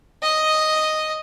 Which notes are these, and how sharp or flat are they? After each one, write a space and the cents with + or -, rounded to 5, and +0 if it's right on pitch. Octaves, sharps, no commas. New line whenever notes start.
D#5 +0